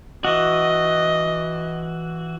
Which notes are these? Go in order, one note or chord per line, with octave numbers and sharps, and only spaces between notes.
E3 F#4 D#5